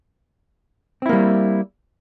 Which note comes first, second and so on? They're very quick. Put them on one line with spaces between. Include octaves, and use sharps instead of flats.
C4 E4 A#3 G3